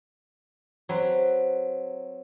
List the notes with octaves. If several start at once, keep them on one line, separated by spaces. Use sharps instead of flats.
F#3 C4 B4